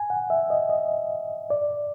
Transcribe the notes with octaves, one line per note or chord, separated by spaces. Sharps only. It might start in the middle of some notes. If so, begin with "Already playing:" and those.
Already playing: G#5
F#5
E5
D#5
D#5
D5